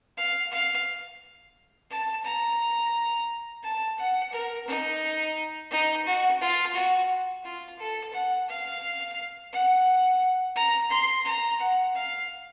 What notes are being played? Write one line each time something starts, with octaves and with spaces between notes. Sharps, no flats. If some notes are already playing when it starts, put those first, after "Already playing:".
F5
F5
A5
A#5
A5
F#5
A#4
D#4
D#4
F#4
F4
F#4
F4
A4
F#5
F5
F#5
A#5
C6
A#5
F#5
F5